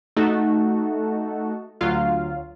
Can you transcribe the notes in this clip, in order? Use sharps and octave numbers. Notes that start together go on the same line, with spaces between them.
A3 D#4 F#4 A4
D2 F#3 F4 F5